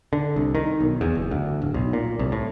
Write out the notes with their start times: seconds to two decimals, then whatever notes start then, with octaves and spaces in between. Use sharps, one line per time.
0.13 D3
0.36 C2
0.55 D#3
0.80 B1
1.01 E2
1.15 F#1
1.31 D2
1.62 D1
1.74 B1
1.93 A#2
2.19 C2
2.32 A2